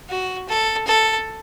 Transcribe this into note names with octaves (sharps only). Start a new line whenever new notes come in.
F#4
A4
A4